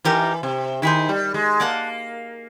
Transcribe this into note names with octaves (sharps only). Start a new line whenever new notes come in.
E3 D#4 G4 A#4
C3
D#3 E4 G#4 C5
G3
G#3
A#3 D5 F#5 A5